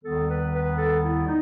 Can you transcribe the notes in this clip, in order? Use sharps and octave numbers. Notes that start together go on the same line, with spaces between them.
D#2 D#3 G3 B3 A4
B4
B4
A4
E4
D#4